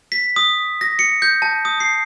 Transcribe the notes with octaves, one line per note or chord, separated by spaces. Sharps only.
B6
D#6
A#6
C#7
G6
A5
D#6
C7